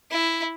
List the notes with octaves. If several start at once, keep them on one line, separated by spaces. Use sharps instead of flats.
E4